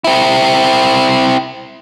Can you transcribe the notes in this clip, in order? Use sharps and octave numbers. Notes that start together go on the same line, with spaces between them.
C4 E4